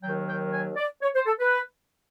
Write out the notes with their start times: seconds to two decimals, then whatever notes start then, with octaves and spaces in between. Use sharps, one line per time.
0.01 D#2 D#3 F#3 G5
0.27 G5
0.51 G#5
0.76 D5
1.02 C#5
1.14 C5
1.26 A4
1.40 B4